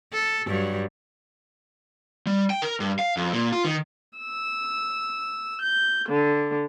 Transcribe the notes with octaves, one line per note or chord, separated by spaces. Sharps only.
A4
G2 F#3 G3
G3
G5
A#4
G2
F5
F2
A#2
F4
D#3
E6
G6
D3